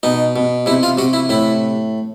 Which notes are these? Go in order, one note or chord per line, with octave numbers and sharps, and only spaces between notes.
B2 D#4
B2
C3 E4
F4
C3 F#4
E4
A2 E4